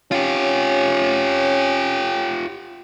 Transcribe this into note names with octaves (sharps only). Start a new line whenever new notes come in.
C#4 F4 G4